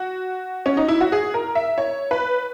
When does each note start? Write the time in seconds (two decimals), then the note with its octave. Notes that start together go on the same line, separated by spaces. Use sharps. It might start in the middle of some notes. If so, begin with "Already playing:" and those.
Already playing: F#4
0.66 C#4
0.77 D#4
0.88 E4
1.01 F#4
1.12 G#4
1.34 A#4
1.55 E5
1.78 C#5
2.11 B4